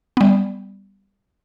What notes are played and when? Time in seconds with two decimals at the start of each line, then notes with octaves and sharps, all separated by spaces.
0.17 G3 B3